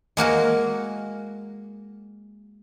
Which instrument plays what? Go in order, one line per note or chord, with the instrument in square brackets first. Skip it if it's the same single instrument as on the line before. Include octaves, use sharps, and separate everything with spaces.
[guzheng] G#3 A#3 F#4 A#4